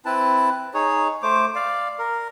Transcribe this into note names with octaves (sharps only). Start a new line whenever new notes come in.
C4 E4 B4 A5
D#4 G#4 C#5
A3 C5 D6
D5 F5
A#4